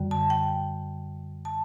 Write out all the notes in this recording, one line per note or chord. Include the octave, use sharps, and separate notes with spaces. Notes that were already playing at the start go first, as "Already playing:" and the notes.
Already playing: F#2 D3 G3
A5
G5
A5